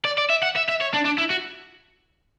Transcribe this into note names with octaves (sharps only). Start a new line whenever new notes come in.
D5
D5
E5
F#5
E5
E5
C#5
D4
D4
E4
F#4